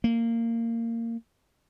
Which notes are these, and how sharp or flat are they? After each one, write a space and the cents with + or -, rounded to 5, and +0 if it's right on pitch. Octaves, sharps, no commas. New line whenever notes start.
A#3 -20